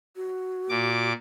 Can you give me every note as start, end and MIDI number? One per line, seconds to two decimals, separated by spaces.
0.16 1.09 66
0.69 1.13 46
0.69 1.13 86